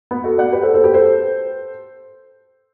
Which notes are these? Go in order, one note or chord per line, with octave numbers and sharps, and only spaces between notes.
B3
F#4 A4
D5 F#5
G4 B4
A4 C5
A4 C5
G4 B4
A4 C5